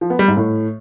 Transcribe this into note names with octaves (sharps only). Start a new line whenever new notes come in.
F3
B3
G3
G#2
A2